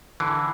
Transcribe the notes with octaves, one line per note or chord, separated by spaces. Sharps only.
D3 E3